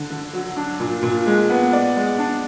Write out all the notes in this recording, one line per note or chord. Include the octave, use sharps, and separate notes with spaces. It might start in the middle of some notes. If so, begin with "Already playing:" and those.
Already playing: D3
D3
F#3
D4
A#2
A#2
G#3
B3
D5
G#3
D4